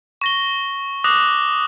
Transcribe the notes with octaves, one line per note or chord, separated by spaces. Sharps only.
C#6 A#6 G7
D6 D#6 F#6 A#6